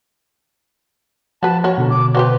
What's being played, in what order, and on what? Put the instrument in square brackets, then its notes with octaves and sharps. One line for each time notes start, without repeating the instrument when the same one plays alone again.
[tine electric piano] F3 [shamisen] F#4 B4 [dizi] A5
[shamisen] F#4 A#4 [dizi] C#5
[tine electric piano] B2 D3
[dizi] D6
[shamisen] F#3 C4 G4 [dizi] B4